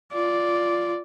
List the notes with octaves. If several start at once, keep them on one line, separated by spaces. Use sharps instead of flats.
F4 D5